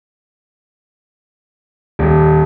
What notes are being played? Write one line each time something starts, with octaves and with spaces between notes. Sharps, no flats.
D#1